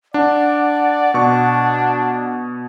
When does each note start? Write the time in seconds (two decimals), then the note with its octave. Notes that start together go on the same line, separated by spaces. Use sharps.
0.14 D4 D5 F#5
1.14 B2 D4 C#6